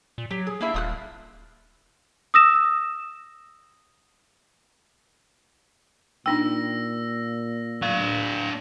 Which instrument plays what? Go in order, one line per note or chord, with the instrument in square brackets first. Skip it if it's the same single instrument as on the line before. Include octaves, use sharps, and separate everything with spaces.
[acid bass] A#2
[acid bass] F#3 [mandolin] G4
[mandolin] G#4
[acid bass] A#3 [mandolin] D4 E4 E5
[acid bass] D#1 [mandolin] F4 D#6 F#6
[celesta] D#6 E6 A#6 E7
[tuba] A#2 [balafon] D4 D#4 G5 [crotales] E6 A#6
[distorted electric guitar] D4 F5